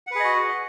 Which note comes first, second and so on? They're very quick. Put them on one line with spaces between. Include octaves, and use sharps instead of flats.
F#5 B4 G#4 D#5 F#4